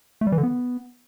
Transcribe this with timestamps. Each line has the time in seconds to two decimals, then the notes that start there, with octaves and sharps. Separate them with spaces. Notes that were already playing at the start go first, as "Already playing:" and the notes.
0.21 A3
0.27 G3
0.32 E3
0.38 D3
0.43 B3